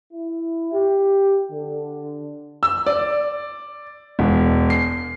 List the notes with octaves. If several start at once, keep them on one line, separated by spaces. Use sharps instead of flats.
E4
G4
D3
E6
D5
E1
C7